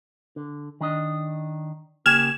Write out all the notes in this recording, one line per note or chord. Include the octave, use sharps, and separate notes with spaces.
D3
D#3 D4 D#5
C#3 A#3 G4 F6 G#6 E7